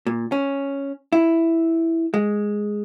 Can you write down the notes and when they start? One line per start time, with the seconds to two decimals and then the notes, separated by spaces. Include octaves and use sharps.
0.07 A#2
0.32 C#4
1.12 E4
2.14 G#3